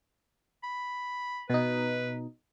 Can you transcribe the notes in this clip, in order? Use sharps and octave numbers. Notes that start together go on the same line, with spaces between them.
B5
B2 D#4 B4